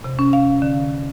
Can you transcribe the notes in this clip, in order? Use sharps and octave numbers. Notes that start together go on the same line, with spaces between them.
C3
C#4
F5
D3